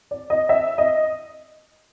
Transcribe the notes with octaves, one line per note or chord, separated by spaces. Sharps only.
D5
D#5
E5
D#5